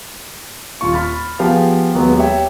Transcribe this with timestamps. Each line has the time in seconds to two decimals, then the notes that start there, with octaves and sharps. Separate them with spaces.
0.81 D#1 F4 C#6
0.93 B5 F6 A6
1.39 F3 B3 G4 G#4 F5
1.94 D#2 F#3 G#3 B3
2.17 G4 C#5 E5 G5